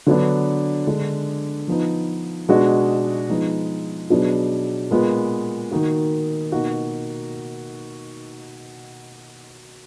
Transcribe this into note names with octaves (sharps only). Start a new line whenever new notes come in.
D3 F#3 B3 D4
D3 G#3 D4
F3 B3 D#4
B2 G#3 D4 F#4
F3 G#3 B3 D#4
B2 F#3 B3 D4 G#4
A#2 G#3 B3
D#3 A#3 D#4 F#4
B2 A#3 D#4 F#4